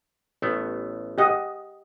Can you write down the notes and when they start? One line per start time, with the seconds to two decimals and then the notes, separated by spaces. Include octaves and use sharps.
0.42 A1 A3 B3
1.18 G4 D#5 F#5